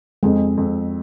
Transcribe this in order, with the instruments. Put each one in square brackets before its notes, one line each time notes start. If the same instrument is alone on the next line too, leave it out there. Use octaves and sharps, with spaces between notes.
[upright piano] F2 [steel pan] G#3
[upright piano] F2